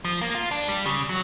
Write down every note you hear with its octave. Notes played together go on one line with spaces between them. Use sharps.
F3
A#3
F4
D4
G3
C#3
F#3